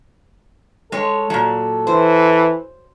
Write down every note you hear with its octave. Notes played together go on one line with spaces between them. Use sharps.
G#3 A4 C#5
A#2 F#3
E3 C5